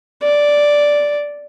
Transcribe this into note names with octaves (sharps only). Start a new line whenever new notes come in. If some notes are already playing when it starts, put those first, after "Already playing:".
D5